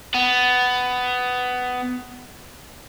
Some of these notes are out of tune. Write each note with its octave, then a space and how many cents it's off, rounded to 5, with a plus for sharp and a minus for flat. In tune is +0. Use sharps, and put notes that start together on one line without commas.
B3 +15